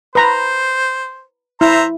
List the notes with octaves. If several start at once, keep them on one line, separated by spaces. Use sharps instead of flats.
B4 C5 A#5 B5
E4 C5 E5 A#5